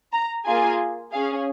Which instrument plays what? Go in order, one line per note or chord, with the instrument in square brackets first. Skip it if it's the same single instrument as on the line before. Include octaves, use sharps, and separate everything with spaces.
[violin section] A#5
A#3 F4 G#4 G#5
C#4 G#4 F5